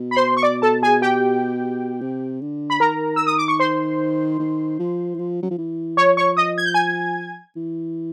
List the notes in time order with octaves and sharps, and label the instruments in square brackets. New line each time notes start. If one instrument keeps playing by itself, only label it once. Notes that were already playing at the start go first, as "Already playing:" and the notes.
Already playing: [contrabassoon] B2
[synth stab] B5
C5 C6
C#6
D5 D6
A4 A5
G#4 G#5
G4 G5
[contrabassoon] C3
D3
[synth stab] B5
[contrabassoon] D#3 [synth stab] A#4 A#5
[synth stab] E6
D#6
D6
C#6
C5 C6
[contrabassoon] D#3
F3
E3
F3
F#3
F3
E3
[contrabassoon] F3 [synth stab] C#5 C#6
[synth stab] C#5 C#6
D#5 D#6
G#6
G6
G#5 G#6
[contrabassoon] E3